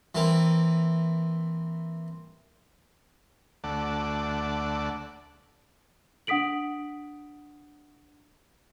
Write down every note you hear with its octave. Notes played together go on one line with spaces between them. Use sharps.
E3 A#3 C4
D2 A3 D5 F#5
D4 F#5 D#6 B6 D7 F#7